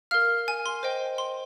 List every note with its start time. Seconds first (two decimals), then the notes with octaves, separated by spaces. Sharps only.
0.11 A#4 F5 F6
0.48 G#5
0.66 C6
0.83 C5 D#5 G5
1.18 C6